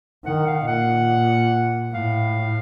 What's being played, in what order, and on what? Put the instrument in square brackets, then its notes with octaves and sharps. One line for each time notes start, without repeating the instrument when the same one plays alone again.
[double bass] D#3 [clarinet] F#5
[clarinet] F5
[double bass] A#2 [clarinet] F#5
[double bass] A2 [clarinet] F5